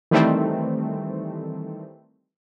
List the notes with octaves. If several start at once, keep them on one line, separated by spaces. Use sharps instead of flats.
D#3 E3 G3 A3 C4